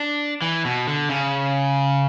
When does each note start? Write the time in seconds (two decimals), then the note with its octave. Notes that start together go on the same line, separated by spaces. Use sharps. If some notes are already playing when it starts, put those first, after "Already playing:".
Already playing: D4
0.42 E3
0.65 B2
0.87 D3
1.09 C#3